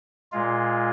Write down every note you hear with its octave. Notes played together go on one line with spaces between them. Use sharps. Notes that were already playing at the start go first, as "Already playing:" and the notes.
A#2 G#3 F4